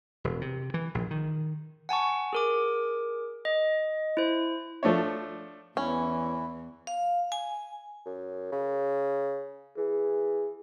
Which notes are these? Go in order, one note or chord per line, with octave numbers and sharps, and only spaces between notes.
E1
C3
E3
A#1
D#3
F#5 G#5 A5 C#6
G#4 A#4 D6
D#5
E4 C5
F3 A3 D4 C#5
E2 E3 C#4 E4
F5
G#5
F#2
C#3
E3 G#4